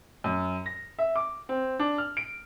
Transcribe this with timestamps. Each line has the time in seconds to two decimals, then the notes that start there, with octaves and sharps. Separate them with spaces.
0.24 F#2
0.66 A#6
0.99 E5
1.16 D6
1.49 C4
1.79 D4
1.98 F6
2.17 D7